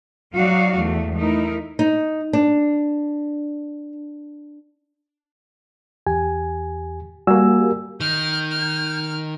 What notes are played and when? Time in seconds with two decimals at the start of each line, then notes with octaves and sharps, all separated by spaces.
0.34 F#3 D#4 F#4 D5 F5
0.77 E2 A3
1.16 A3 D#4 E4 A#4
1.79 D#4
2.33 D4
6.07 E2 G4 G#5
7.27 G3 A#3 F#4 G#5 E6
8.01 D#3 F6 G6
8.51 F6